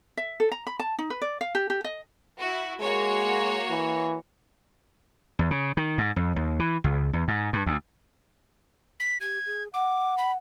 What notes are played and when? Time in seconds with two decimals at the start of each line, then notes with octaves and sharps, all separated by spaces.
0.17 E5
0.40 A4
0.52 A#5
0.67 B5
0.79 A5
0.99 D#4
1.10 B4
1.22 D5
1.41 F5
1.55 G4
1.70 G4
1.84 D#5
2.37 E4 F#4
2.80 G#3 A#3 F#4 C#5
3.70 E3
5.39 E2
5.51 C#3
5.77 D#3
5.98 G#2
6.16 F2
6.36 D#2
6.59 E3
6.84 C#2
7.13 E2
7.28 G#2
7.53 G2
7.66 D2
9.00 B6
9.21 G4 G#6
9.46 G#4
9.74 F#5 D6
10.18 B5